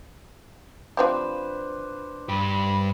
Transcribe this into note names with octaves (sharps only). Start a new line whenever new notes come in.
F3 C4 D4 G4 B4 C5
G2 G4 B5